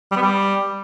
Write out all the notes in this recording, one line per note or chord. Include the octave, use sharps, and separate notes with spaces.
G3
B3
G3